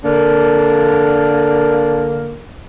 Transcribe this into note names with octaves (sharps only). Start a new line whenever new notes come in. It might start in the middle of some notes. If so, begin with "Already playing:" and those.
D3 A#3